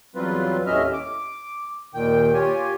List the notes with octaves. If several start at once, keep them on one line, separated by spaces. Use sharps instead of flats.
E2 F#3 G3 C4 F4 B4
D#2 A2 C#4 D#5 E5 F6
D6
D#2 A#2 D#3 G5
F4 G4 C#5 G#5